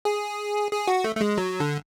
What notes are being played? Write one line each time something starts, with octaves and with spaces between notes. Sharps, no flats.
G#4
G#4
F#4
A3
A3
G#3
F#3
D3